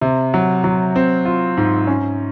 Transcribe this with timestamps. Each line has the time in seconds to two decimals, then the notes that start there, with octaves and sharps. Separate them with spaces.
0.01 C3
0.34 F#3
0.64 F#3
0.96 C4
1.25 F4
1.57 G#2
1.87 C#4